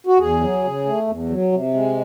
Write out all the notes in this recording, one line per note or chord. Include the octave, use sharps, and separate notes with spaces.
F#4
E2 G#4
F#3
C#3
A3
E2
F#3
C3
G#3